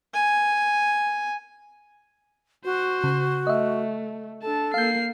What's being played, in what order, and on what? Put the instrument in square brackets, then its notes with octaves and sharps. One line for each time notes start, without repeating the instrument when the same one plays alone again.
[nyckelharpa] G#5
[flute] F#4 [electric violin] C5
[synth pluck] C#3
[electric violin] A3 [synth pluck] D#5 E5
[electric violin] D4 A5 [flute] A4
[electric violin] A#3 C7 [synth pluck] F5 G6